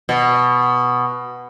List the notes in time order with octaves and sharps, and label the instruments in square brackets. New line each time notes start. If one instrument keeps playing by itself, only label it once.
[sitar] B2